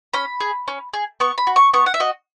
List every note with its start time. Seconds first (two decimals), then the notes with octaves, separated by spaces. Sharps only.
0.14 C#4 B5
0.41 G#4
0.68 C#4
0.93 G#4
1.20 B3 C#6
1.38 B5
1.47 F#4
1.56 C#6
1.73 B3 C#6
1.86 F#5
1.94 E5
2.00 F#4 D#5